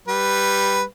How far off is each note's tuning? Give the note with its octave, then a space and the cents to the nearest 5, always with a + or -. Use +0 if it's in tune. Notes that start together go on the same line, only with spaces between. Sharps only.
G3 +0 B4 +0